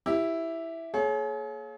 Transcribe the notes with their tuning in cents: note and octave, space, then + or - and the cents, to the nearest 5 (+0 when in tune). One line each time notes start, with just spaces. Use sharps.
E4 +0 G4 +0
A#3 +0 G#4 +40 C#5 -10